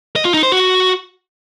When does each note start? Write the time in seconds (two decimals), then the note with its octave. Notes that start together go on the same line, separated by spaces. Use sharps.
0.16 D#5
0.25 F4
0.34 D#4
0.43 C5
0.52 F#4